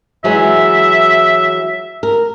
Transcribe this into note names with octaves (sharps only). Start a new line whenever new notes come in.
E3 F#3 G#3 E5
A#4